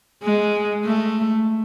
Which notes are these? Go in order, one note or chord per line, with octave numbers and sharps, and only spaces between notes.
G#3
A3